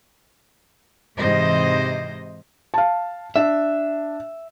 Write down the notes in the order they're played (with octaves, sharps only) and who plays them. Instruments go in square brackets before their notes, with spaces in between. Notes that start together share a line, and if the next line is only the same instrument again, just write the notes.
[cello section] G#2 C3 E3 C5 D#5
[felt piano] F5 A5
[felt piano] D4 [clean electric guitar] E5